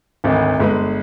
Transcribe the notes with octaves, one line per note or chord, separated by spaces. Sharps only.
G#1 D2
G1 G#3 B4